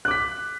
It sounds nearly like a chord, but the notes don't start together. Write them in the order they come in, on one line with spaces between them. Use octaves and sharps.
F#6 D6 B6